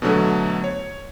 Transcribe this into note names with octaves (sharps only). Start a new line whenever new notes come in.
B2 D3 F#3 A3
C#5